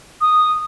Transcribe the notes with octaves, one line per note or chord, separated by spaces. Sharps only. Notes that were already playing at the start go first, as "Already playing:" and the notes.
D#6